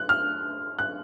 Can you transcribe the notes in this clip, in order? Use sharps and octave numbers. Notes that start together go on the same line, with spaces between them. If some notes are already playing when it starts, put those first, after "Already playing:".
Already playing: F#6
F6
F#6